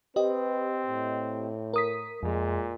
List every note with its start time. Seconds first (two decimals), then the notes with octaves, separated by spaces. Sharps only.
0.16 C4 G4 B4 D#5
0.86 A2
1.74 A#4 D#6 B6
2.23 F2 A#2 G#3